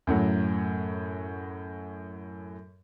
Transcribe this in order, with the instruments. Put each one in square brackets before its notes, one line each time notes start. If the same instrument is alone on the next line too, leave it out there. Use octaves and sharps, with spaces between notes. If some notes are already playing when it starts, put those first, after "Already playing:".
[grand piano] F#2 A2 F#3